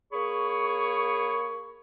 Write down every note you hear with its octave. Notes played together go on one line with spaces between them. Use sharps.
A#3 G#4 C#5 B5 C#6